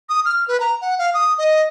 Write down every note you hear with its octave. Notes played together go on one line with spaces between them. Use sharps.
D#6
F6
B4
A#5
F#5
F5
D#6
D#5